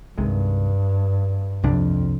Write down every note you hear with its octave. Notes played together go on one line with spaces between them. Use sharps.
C2 G2 C3 D#3 G#3
C2 F2 C3 G3 D4